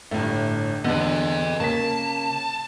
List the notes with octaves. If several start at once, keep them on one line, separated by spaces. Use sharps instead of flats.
G1 A2 A3
E2 D3 B3 A4 D#5
C#3 A#3 A5 B6